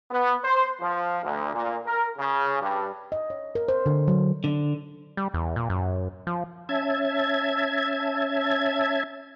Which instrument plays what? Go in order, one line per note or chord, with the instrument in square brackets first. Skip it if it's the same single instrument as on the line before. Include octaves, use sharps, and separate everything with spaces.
[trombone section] B3
C5
F3
D2
A#2
A#4
C#3
G2
[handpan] D#5
C#5
A#4
C5
D3
F#3
[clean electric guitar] D3
[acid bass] G3
E2
A#2
F#2
F3
[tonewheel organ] C#4 E5 A5 G#6